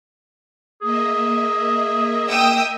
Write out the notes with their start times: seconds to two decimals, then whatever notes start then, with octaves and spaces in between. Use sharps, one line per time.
0.82 A#3 G#4 D#5 E5
2.28 G5 D#6 E6